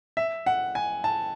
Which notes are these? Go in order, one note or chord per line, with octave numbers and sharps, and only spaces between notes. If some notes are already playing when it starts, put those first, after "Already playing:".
E5
F#5
G#5
A5